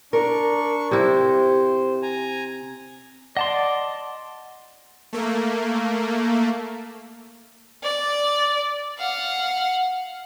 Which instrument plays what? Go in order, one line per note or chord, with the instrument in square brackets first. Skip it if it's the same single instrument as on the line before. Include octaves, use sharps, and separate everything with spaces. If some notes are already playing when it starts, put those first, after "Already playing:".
[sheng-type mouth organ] D4 C#6 [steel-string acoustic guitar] A#4
[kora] C3 E4 [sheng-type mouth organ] C5
[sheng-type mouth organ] G#5 A#5
[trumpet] D5 [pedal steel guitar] D#5 A5 C6 [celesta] F#5
[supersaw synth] A3 A#3
[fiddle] D5
F5 F#5